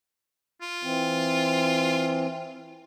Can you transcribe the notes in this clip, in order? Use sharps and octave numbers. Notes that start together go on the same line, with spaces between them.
F4
E3 C4